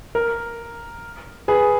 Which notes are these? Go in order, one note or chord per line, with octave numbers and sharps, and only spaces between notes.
A#4
G#4 B4